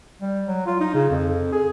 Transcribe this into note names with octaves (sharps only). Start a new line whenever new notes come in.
G3
F#3
F4
D#4
C#3
F2
G#4